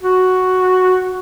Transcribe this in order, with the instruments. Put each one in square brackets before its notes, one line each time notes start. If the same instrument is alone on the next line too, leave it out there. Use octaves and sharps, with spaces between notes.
[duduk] F#4